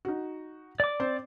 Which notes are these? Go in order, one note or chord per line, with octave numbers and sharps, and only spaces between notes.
D#4 F#4
D5 D6
C4 C5